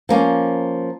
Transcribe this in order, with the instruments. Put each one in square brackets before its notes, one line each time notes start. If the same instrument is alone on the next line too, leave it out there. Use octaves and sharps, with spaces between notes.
[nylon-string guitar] F3 A#3 C#4